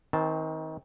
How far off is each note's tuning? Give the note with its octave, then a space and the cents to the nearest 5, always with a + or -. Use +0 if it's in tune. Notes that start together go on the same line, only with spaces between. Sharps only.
D#3 +30 C4 +0 A5 -10